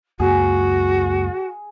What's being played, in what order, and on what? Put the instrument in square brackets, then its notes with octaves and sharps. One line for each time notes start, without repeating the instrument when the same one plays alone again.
[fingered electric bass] C#2 F#2 A#3 [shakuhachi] F#4 [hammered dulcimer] G#4